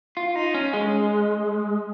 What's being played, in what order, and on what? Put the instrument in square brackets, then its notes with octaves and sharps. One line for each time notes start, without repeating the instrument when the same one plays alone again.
[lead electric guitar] F4
D#4
C#4
G#3